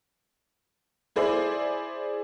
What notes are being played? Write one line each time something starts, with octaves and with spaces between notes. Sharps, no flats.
E4 G#4 C5 D5 E5